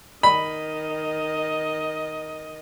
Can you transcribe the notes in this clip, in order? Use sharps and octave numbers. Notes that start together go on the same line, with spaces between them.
D#3 D#5 B5